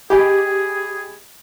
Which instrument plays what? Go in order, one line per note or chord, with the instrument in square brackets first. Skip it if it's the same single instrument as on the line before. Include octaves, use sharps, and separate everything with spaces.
[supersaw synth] G4 [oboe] G#4 [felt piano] D#5 G#5 B5